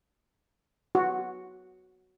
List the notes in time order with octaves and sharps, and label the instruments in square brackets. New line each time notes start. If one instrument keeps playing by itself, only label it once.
[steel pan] F#4